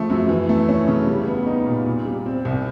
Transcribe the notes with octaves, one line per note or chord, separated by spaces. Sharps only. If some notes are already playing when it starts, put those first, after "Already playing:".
Already playing: C#3 F3 A3
F#2
E3
A3
C#4
C#3
G3
B3
D#4
A#2
A#2
G3
C4
C2